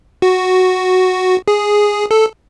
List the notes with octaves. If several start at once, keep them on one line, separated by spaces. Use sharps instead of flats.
F#4
G#4
A4